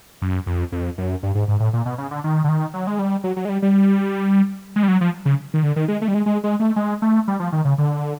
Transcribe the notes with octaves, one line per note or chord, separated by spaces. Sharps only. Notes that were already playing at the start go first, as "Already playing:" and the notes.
F#2
F2
F2
F#2
G2
G#2
G#2
A2
A#2
B2
C#3
D3
D#3
D3
D#3
F#3
G#3
G3
F#3
F#3
G#3
G3
G3
G#3
G3
F#3
F3
C#3
D#3
D3
D#3
G#3
A3
G3
G#3
G#3
G#3
A3
G#3
A3
G3
F3
D#3
C#3
D3